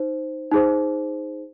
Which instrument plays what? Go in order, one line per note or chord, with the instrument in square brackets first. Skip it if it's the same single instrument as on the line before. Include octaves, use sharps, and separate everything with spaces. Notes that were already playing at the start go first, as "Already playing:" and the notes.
Already playing: [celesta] D#4 C5
D#4 G#4 C5